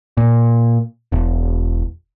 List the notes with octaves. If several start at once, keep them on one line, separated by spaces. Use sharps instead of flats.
A#2
E1